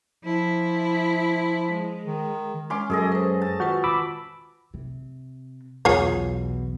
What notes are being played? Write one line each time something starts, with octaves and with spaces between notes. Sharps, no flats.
F3 E4
G#3
D#3
G#3 C#4 C6 D6
F#2 G#4 A4 D#5
B4 C5
A5
D#3 F4 F#4 B4
B5 D6 E6
C3
B1 E2 B2 F4 G#4 C#5